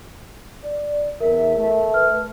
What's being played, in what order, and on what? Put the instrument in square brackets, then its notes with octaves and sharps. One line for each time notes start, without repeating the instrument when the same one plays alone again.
[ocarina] D5
[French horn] E2 [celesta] A#4 [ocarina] E5
[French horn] A3
[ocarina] B4 [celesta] F6